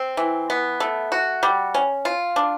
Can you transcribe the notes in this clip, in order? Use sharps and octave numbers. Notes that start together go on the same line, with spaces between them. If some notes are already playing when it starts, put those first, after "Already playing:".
Already playing: C4
E3
B3
A3
F#4
G3
C#4
F4
D4